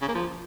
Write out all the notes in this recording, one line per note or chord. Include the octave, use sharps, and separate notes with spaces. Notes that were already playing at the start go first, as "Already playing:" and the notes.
C#3
A#3
F3